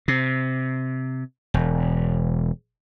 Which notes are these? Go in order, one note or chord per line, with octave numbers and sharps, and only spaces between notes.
C3
E1